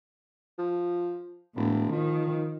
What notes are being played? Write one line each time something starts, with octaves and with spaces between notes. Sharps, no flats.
F3
E1 A2
D#3 F3